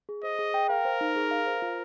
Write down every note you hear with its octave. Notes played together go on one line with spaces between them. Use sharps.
G#4
C5 D#5
G#4
G5
A#4 F5
C5
D#4
G#4
F5
C5
F4